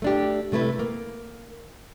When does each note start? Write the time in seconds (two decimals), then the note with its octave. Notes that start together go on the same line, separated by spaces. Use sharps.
0.02 A3 D4 G4
0.52 C3 A3 E4 B4
0.79 A#3